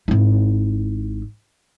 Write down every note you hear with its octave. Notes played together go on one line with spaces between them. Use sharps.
G#1 E4